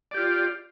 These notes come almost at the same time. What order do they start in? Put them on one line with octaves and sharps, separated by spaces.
D5 G4 F4